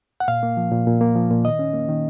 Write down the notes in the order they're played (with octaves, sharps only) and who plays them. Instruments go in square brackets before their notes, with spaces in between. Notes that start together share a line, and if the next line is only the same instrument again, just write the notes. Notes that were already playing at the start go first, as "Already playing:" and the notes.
[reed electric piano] F#5
A#2 F5
A#3
F3
A#2
A#2
A#3
F3
A#2
D#3 D#5
C#4
A#3
D#3